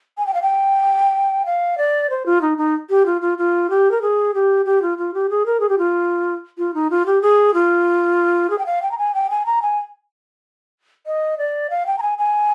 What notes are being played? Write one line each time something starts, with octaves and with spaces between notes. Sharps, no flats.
G#5
G5
F5
G5
F5
D5
C5
F4
D#4
D#4
G4
F4
F4
F4
G4
A#4
G#4
G4
G4
F4
F4
G4
G#4
A#4
G#4
G4
F4
F4
D#4
F4
G4
G#4
F4
G#4
G5
F5
G5
A#5
G#5
G5
G#5
A#5
G#5
D#5
D5
F5
G5
A#5
G#5
G#5